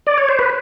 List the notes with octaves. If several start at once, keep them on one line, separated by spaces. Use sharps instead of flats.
D5
C#5
C5
B4